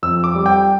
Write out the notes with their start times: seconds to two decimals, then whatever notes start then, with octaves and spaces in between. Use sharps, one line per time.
0.03 F2 E6
0.24 D6
0.35 G3
0.46 G5